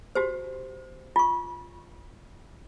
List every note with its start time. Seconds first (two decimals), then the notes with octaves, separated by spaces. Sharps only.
0.15 F#4 G4 C5
1.16 F4 C#6